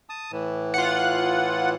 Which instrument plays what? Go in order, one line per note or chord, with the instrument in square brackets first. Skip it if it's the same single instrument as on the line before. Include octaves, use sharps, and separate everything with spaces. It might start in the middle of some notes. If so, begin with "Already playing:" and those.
[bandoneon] A5 D#6
A2 E3
[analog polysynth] F4 F#5